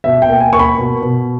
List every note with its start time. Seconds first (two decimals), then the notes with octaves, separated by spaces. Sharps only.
0.04 B2 E5
0.22 G5
0.29 A#3
0.40 G#5
0.53 A#3 C#6
0.59 B5
0.78 B2
1.02 B2